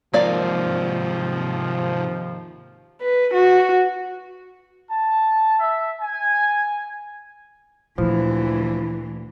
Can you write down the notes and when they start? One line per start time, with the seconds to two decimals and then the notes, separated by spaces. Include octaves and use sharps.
0.14 D#2 G#2 C3 F3 A#3 D5 F5
3.02 B4
3.35 F#4
4.90 A5
5.60 E5
6.00 G#5
7.98 D2 A#2 E3 F3 A#3 E4